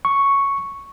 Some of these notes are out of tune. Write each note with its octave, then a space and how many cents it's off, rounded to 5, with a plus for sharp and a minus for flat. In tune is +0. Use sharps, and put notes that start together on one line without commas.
C#6 +0